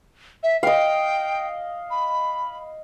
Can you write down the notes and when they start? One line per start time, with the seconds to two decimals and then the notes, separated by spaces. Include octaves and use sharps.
0.43 E5
0.63 D#5 F5 G5
1.90 B5